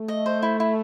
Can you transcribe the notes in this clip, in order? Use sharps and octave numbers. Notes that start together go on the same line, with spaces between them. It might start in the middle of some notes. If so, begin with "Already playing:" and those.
Already playing: A3
D#5
C5
E4
E4